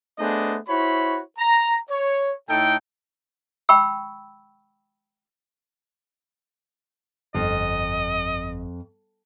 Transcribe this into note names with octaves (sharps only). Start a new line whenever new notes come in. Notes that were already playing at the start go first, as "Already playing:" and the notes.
A3 B3 D4 G#4 C5 D#5
E4 F#4 C5 C#5 B5
A#5
C#5
A2 A3 D#4 A4 G5
G5 B5 C#6 E6
G1 F2 D#5